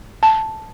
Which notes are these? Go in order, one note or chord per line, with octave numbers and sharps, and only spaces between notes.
A5